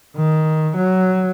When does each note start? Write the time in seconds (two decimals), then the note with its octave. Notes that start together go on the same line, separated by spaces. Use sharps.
0.17 D#3
0.76 F#3